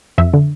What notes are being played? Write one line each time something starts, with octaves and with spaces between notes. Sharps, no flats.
F2 E5
D3